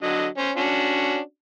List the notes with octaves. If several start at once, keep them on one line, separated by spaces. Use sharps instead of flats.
D3 F#3 D#5
C#4 C5
C#4 D4 F#4